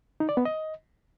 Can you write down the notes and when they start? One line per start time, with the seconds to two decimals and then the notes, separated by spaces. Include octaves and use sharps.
0.20 D#4
0.29 D5
0.37 B3
0.45 D#5